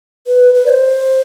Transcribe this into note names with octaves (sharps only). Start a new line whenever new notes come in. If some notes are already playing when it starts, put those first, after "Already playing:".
B4
B4
D5
C5